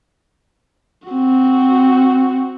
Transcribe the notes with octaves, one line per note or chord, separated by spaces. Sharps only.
C4 F#4